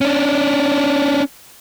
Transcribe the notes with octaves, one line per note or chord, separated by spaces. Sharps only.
C#4 D4